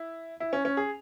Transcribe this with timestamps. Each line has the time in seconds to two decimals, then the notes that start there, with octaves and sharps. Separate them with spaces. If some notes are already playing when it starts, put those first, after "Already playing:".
Already playing: E4
0.40 E4
0.53 C#4
0.65 C#4
0.77 G#4